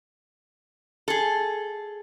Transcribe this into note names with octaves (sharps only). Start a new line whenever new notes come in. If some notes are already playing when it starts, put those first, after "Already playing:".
G#4 A4